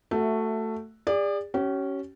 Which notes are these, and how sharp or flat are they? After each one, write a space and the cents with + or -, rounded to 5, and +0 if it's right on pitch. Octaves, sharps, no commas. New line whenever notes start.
A3 +10 F#4 +0 E5 +0
G#4 -40 D5 +0
C#4 +0 G4 -45